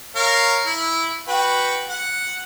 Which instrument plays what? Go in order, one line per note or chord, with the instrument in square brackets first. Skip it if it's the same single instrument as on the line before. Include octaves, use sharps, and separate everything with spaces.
[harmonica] A#4 C#5 F5
E4
F#4 B4 G5
F#5